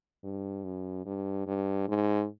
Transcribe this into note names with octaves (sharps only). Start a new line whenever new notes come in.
G2
F#2
G2
G2
G#2